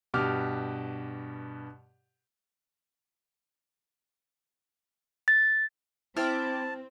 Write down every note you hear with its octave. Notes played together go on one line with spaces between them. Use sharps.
G2 B2 G4 D6 F6
A6
C4 E4 C5 G5 A5 D6 F6